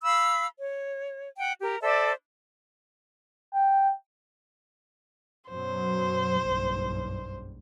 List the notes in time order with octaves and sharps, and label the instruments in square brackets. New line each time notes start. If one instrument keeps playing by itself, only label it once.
[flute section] F5 B5 E6
C#5
F#5 G5
G4 A#4
A4 C5 D5 E5
[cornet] G5
[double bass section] F#2 B2 F#3 [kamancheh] C5
[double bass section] F#1 B1 G2